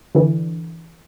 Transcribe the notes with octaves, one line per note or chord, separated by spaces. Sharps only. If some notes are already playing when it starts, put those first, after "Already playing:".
D3 E3